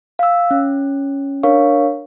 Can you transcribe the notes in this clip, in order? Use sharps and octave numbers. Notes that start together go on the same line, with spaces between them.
F5 E6
C#4
D4 A#4 C#5 F5 C#6